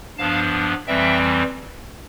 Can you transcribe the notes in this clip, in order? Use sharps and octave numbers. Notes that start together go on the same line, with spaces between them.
G2 F3 B3 D4 F5 A5
F2 E3 G3 C4 E5 G5